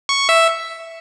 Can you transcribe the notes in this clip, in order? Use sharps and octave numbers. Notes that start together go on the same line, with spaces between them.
C#6
E5